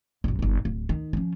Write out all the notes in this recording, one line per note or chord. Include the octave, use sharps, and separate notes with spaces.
A#1 F#2
G1 D#4
D1
D#3
F3 C#4